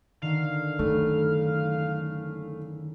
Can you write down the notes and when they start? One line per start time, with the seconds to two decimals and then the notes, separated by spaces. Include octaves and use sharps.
0.22 D3 D#3 A#3 F5
0.79 F#1 D#3 A3